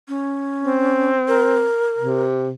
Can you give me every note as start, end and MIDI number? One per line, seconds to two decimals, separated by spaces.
0.08 1.11 61
0.64 1.67 60
1.28 2.22 70
1.98 2.51 48